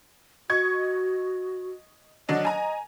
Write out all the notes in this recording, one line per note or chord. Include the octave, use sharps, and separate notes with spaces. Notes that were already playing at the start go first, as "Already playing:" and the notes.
F#4 D#5 C#6 G#6
D3 F#3 D4 D#5
G#5 A#5